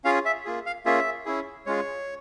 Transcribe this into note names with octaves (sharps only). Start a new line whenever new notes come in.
C#4 F4 G#4 F5
E5
A#3 F4 G#4
F5
A#3 C#4 F4 G#4 E5
C#4 E4 G#4
G#3 C#4 F4 G#4 C#5